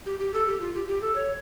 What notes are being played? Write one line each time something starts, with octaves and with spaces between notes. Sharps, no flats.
G4
G4
A4
G4
F4
G4
G4
A4
C#5